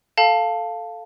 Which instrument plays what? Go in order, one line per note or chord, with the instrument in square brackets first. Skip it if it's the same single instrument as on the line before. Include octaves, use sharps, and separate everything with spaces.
[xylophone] A4 F5 A5